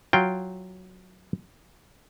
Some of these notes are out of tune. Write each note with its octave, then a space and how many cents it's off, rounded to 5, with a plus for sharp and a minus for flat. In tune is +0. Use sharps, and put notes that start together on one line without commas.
F#3 +0 F4 +0 G5 +0